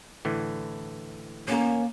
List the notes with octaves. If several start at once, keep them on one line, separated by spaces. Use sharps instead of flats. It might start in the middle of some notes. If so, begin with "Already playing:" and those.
A2 D3 E3
A#3 C#4 A#4